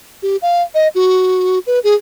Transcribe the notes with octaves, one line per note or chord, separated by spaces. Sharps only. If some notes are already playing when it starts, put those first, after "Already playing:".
G4
F5
D#5
F#4
B4
G#4